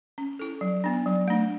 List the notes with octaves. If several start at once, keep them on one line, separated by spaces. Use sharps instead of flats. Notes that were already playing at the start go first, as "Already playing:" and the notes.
C#4
E4 A4
F#3
B3 D4
F#3
A3 D4